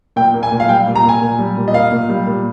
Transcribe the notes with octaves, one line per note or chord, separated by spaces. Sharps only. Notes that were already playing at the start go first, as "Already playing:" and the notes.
A#2 G5
A#3
G#5
A#2
F5
G3 G5
A#2
A#5
A#3 G#5
A#2
G3
A#2
D#5
A#3 F5
A#2
G3
A#2